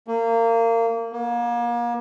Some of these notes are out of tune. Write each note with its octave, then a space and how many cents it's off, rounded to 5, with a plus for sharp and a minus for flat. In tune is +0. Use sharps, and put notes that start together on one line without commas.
A#3 -25
A#3 +35